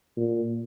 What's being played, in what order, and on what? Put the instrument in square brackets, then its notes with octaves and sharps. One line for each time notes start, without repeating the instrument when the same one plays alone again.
[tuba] A#2